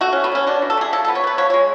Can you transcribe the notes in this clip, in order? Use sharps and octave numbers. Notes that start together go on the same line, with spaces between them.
A3 F#4
A3 C#4
B3
A3 C#4
B2 D4
B2
A4
A3 G#4
F3 A4
B3 A4
C#5
B3 B4
F3 C#5
G#3 C#5